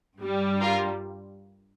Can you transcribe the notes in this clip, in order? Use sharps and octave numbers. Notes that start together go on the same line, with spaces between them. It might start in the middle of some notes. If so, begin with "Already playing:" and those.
G2 G3
F4 A#4